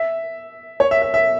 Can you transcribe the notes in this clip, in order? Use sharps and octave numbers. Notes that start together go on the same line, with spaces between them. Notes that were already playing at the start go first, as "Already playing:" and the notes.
Already playing: E5
C#5
E5
E5
E5